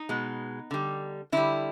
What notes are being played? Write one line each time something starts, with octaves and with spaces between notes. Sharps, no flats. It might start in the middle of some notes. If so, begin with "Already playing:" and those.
Already playing: D#4
B2 G#3
D3 G3
D3 G3 E4